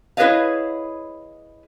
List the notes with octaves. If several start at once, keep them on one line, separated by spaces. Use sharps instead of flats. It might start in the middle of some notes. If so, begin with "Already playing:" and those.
E4 G#4 B4 C#5 D#5 F5